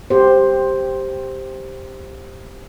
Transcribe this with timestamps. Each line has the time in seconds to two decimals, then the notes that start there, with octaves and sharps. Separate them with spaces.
0.10 G4 C5